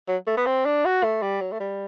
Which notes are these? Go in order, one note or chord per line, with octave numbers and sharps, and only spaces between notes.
F#3
A3
B3
C4
D4
F#4
A3
G3
F#3
A3
G3